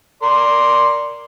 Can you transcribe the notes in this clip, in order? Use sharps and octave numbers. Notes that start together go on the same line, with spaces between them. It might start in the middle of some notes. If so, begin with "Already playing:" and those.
A#4 D5 C6